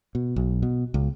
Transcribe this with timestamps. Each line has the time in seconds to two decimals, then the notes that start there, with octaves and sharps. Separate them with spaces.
0.15 B2
0.36 B1
0.63 B2
0.94 C#2